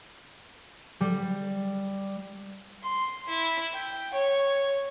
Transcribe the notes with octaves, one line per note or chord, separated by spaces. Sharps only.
G3
C6
E4
G5
C#5